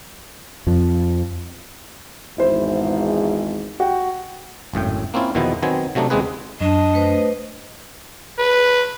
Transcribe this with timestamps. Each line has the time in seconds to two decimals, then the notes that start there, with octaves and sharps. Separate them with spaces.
0.67 F2 F3
2.38 G#1 E2 G#2 E4 C5
3.80 F#4 G5
4.74 G#1 F#2 A2 G5
5.14 A#3 C4 C#4 E4 F4
5.35 E2 B2 D#3 F3 B3 E4
5.63 D#3 F#3 B3 C4 G#5
5.95 C3 F#3 A3 D4 D#4
6.10 D#2 C#3 G#3 C4 G#4 B4
6.61 F#2 D4 D#5
6.94 A3 B4 C5
8.39 B4